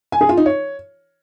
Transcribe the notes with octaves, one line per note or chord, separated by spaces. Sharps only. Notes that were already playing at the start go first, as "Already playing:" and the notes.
G#5
G#4
F4
D#4
C#5